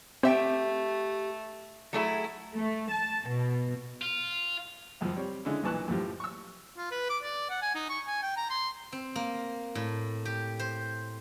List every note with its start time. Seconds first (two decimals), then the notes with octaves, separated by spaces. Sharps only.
0.23 A3 C4 G4 E5 G5
1.93 F#3 A3 E4 G#4
2.56 A3
2.92 A5
3.29 B2
4.02 F4
5.01 C#2 F#2 F3
5.16 G3 C4 C#5
5.45 D3 G#3 C#4 E4
5.63 B1 A#2 E3 A5 C#6 F#6
5.88 F#2 A2 F3 G4
6.20 C#6 E6
6.77 F4
6.91 B4
7.10 D6
7.23 D5
7.50 F#5
7.62 G#5
7.75 D#4
7.89 C#6
8.07 G#5
8.23 G5
8.37 A#5
8.50 C6
8.92 C4
9.16 A#3
9.75 A2
10.25 G4
10.59 C5